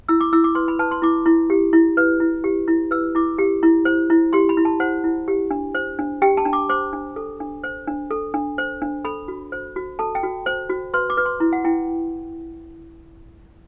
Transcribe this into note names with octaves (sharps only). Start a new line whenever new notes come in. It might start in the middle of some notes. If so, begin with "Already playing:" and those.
E4 E6
D6
E4 E6
D6
B4 C6
B5
B4 A5
C6
E4 D6
E4
G4
E4
B4
E4
G4
E4
B4 E6
E4 D6
G4
E4
C5
E4
G4 C6
B5
E4
A5
C5 F#5
E4
G4
D4
C5
D4
G4 G5
A5
D4
D6
C5 D6
D4
A4
D4
C5
D4
A4
D4
C5
D4
A4 B5
F#4
C5
F#4
A4 A5
G5
F#4
C5
F#4
B4 C6
D6
B4
C6
E4
F#5
E4 G5